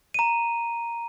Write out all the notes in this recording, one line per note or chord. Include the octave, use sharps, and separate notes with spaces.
A#5 D#7